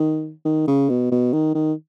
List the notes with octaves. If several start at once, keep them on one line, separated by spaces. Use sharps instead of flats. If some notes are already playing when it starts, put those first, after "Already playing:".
Already playing: D#3
D#3
C#3
B2
B2
D#3
D#3